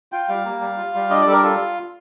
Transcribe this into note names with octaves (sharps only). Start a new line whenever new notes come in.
F4 G5
G3 F5
A#3
G3
F4
G3
D4 D#5
D5
G3 A4
A#4
F4 A4